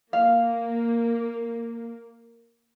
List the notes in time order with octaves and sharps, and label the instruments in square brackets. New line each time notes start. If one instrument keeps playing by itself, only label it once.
[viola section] A#3 [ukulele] F5